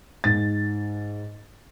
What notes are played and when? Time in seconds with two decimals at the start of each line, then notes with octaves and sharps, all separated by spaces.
0.24 G#2 A6